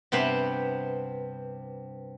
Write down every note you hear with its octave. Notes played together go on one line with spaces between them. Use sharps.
G2 C3 B3 C4 C5 B5